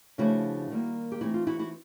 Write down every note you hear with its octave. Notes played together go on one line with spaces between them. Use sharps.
C#3 F3 A3 D4 E4 F#4
D#3 G3 A#3
G4
E3 A3 C4 D#4 E4 F#4
F4
E4 F#4
E4 F#4